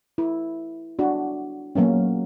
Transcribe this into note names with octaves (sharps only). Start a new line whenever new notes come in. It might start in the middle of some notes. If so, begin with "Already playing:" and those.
E4
D4 F#4
F#3 A#3 B3 C#4